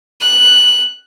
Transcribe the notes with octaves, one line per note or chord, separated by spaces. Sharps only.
F#6